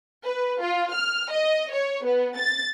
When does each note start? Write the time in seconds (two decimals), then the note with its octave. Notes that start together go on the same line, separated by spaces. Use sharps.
0.25 B4
0.62 F4
0.92 F6
1.31 D#5
1.70 C#5
2.04 B3
2.37 A6